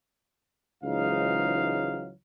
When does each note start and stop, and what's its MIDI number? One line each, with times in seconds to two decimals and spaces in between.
0.84 2.10 37
0.84 2.10 44
0.84 2.10 52
0.84 2.10 54
0.84 2.10 63
0.84 2.10 77